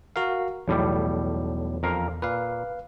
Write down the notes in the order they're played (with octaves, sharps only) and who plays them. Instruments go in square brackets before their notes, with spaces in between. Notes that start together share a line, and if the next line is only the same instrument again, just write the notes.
[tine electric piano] F#4 A#4 F5
[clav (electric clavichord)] B1 A2 G3 [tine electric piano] E2
[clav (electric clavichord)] F2 A#4 F5
[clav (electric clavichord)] A#2 [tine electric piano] B4 F5